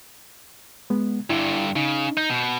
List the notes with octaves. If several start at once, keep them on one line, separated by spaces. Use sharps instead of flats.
G#3 B3
G2 D3 E4
C#3 D#4
D#4 G6
B2